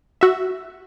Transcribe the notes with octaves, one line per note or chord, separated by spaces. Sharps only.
F#4 E5